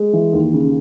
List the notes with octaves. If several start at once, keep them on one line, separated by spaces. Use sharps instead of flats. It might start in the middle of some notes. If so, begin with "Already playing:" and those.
Already playing: G#3
E3
D#2
C#3